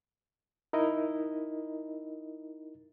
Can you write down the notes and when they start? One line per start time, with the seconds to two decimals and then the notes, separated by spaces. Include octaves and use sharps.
0.73 D#4 E4 A#4 D#5